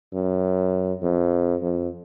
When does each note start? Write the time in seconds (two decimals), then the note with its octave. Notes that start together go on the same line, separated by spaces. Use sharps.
0.13 F#2
1.02 F2
1.62 F2